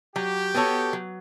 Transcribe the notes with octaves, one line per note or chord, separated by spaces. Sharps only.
F#3 G4
B3 F#4 A4 C#5
F#3